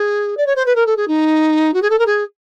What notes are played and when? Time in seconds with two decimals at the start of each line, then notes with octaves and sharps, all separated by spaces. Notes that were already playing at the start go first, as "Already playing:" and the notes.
Already playing: G#4
0.37 D5
0.46 C#5
0.56 C5
0.66 B4
0.76 A#4
0.86 A4
0.97 G#4
1.08 D#4
1.74 F#4
1.82 G#4
1.90 A4
1.99 A#4
2.06 G#4